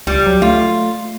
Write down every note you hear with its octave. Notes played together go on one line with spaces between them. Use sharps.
C#2 G3
F#3
A3 F4